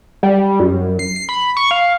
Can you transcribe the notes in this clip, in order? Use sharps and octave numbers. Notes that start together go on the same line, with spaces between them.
G3
F#2
C7
C7
B5
C#6
F5